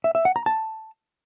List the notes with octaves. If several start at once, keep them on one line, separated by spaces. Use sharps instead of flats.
E5
E5
F#5
A#5
A5